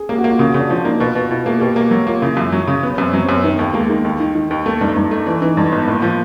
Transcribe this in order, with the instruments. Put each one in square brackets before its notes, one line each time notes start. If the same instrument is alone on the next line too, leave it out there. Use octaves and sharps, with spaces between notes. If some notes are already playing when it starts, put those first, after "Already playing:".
Already playing: [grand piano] G#4
[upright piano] A#3 [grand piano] G4
[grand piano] F#4
[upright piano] A#3
[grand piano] F4
[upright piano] C#3 [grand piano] F#4
[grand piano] F#4
[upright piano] C#3
[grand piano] D4
[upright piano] F3 [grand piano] D4
[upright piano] A#3 [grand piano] D#4
[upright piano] B2 [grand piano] F4
[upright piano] B2
[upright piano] B2 [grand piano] E4
[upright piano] A#3 [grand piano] G#4
[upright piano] B2 [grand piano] G4
[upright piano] A#3
[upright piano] F#3 [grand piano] F#4
[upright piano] A#3 [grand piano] F4
[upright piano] C#3 [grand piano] E4
[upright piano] F#2
F#3
C#3
B3
[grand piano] C#4
[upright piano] F#2 [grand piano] C4
[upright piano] F#3 [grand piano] B3
[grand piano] C4
[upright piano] F#2 [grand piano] B3
[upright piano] D#3 [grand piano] B3
[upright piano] D#2 [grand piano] A3
[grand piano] G#3 [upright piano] A#3
[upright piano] D#3 [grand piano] A3
[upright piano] D#2
D#3
D#3
D#2
[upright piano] A3 [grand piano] A#3
[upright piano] G2 [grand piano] D#4
[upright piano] G2 [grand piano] D#4
[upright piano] A3
[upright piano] E3 [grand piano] D4
[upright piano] E3 [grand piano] D#4
[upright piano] G2 [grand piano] D#4
[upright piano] G#1 [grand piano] B3
[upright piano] A2 [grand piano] A#3
[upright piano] F3